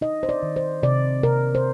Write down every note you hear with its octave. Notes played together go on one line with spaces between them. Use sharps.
D#4 D#5
C5
D5
D#3
C5
C3 D5
C3 A#4
C5